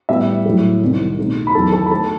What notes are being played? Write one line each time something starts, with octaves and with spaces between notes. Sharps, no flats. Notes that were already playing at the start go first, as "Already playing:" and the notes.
A2 G3 B3 E4 E5
A2 F#3 A3
C2 C3 D#3
B2 A3 D#4
B5
E2 D#3 F#3 A4 A5
A4 A5
B5
D#3 A3 A4 A5